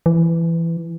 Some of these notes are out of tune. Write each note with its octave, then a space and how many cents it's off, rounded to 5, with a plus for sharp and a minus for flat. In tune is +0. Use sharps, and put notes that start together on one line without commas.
E3 +15